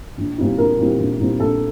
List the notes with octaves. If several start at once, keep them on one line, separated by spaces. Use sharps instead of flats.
A#1
A#2 G3 C4 D#4
A#1 A#4
A#2 G3 C4 D#4
A#1
A#2 G3 C4 D#4
A#1 A4